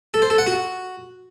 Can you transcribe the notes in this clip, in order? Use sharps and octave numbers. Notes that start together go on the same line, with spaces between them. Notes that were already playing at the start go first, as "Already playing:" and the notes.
A4
C5
A4
F#5
F#4